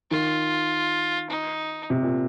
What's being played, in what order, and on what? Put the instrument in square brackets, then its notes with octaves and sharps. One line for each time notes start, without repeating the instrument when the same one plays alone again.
[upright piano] D#3 [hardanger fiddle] F4
[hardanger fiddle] D#4
[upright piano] C3
A#2